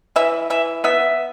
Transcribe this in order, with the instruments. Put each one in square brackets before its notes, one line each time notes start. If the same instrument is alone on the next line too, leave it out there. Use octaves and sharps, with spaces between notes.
[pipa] E3 E5
E3 E5
B3 E5